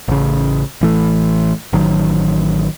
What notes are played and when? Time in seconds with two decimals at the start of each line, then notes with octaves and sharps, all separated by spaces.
0.08 A1 C#3
0.81 A1 E3 A3
1.73 A1 D#3 F#3